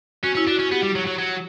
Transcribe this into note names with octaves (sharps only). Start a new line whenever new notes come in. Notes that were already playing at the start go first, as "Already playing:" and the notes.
C#4 F#4
C#4 E4
D4
F#4
C#4
B3 G4
G3
F#3
F#3
F#3